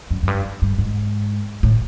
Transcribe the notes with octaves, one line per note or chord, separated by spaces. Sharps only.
F#2
F#2
G2
G2
G#2
A2